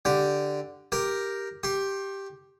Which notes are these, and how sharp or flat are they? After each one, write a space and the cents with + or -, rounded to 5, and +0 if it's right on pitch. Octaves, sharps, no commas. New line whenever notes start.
D3 +0 G4 +0
G4 +0 A#4 +0
G4 +0 C6 +40